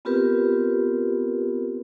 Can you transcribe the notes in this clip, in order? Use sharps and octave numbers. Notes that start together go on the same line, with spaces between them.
B3 C4 F4 G4 A#4 B4